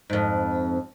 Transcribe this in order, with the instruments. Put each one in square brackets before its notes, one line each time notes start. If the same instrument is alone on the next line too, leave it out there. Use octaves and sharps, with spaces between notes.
[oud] F2 G#2